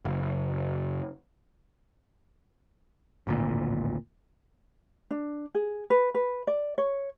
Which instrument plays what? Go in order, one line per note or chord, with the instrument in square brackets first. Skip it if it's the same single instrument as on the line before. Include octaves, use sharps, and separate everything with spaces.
[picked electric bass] F#1
D1 G#1 D2 A#2
[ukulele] D4
G#4
B4
B4
D5
C#5